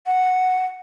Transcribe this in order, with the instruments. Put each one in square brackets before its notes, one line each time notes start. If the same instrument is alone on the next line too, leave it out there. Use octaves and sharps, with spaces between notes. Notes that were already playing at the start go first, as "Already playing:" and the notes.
[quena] F#5